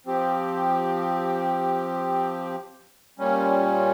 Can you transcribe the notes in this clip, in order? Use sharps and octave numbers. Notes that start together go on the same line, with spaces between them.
F3 C4 G4
A#2 G3 C#4